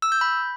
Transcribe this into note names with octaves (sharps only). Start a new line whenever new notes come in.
E6
G6
B5